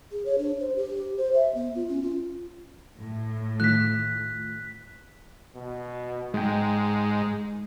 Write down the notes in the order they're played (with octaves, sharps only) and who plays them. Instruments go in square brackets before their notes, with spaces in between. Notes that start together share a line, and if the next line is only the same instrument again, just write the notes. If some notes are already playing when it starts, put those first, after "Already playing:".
[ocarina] G#4
C#5
D4
C5
G4
C5
E5
B3
F4
C#4
F4
[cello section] A2
[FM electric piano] D#3 A3 F4 [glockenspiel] F#6 B6
[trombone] B2
[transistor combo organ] G#2 [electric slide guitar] G#3 G5 [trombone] D#4